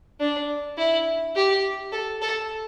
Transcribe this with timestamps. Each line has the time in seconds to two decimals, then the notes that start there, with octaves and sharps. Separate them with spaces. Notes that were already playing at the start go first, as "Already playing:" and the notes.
0.20 D4
0.78 E4
1.36 G4
1.92 A4
2.22 A4